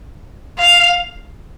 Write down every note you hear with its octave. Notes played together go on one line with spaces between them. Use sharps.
F5